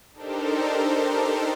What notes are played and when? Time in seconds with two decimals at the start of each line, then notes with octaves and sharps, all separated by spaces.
0.12 D4 D#4 G4 A4 A#4 C5